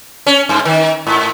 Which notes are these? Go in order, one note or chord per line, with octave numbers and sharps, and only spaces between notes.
C#4
G2
D#3
G#2